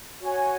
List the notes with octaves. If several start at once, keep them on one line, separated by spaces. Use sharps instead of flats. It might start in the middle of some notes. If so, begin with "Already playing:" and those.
F#4 C#5 G#5